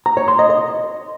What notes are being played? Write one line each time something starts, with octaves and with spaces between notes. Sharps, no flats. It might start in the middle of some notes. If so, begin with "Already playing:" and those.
A#5
C#5
C6
D#5
D#5